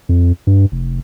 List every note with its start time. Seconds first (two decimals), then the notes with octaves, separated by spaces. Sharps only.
0.09 F2
0.47 G2
0.72 F1